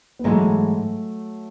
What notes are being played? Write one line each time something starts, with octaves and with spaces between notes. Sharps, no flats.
B3
G#2 E3 F#3 G#3 A3 D#4